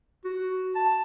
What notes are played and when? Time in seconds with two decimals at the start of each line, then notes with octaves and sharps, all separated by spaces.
0.25 F#4
0.76 A5